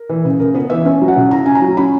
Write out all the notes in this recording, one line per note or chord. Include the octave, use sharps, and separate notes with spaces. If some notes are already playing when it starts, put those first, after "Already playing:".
Already playing: A#4
E3
C#3
C#3 A#4
B3 B4
E3 E5
C#4 E5
F#3
F#5
C#3
E4 A#5
C#4 G#5
A#5
F#3
C#4 B5